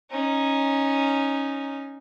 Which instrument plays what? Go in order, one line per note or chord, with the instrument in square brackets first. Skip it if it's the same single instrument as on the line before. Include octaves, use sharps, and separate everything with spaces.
[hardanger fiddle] C#4 D#4